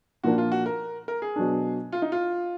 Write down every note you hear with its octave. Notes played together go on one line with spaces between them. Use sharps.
A#2 F3 A#3 D4 F#4
F4
F#4
A#4
A#4
G#4
B2 F#3 D4
F4
D#4
F4